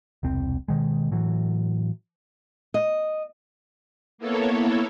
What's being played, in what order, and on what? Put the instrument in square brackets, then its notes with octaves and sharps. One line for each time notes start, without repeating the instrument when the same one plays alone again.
[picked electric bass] E1 C2 C4
B2 D#3 G#3
A2 E3 F#3
[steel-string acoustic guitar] D#5
[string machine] A#3 B3 E4 A4 C#5